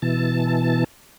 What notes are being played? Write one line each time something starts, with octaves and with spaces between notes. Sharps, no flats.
B2 E3 A5